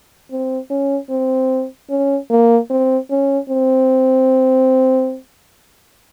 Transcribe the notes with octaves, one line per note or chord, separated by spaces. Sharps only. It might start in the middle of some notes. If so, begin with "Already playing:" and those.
C4
C#4
C4
C#4
A#3
C4
C#4
C4